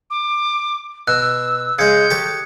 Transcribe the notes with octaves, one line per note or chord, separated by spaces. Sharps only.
D6
B2 E6 F#6
C#3 G#3 D#6 G6 G#6 C#7
G4 A4 C#5